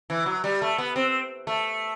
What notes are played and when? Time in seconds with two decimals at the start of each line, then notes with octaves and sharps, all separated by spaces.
0.10 E3
0.26 F#3
0.44 G3
0.62 A3
0.78 B3
0.96 C4
1.47 A3